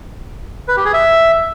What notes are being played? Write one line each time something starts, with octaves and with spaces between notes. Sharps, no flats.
B4
G4
G#4
E5